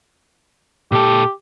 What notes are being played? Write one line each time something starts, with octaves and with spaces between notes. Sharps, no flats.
A#2 G4 A4